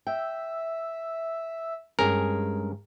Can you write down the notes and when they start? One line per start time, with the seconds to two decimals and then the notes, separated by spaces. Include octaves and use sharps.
0.07 E5 G5
1.99 G2 G#3 C#4 G#4 A#4